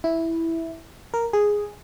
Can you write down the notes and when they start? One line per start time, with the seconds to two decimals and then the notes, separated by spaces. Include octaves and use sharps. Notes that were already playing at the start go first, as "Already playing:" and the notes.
0.04 E4
1.14 A#4
1.33 G#4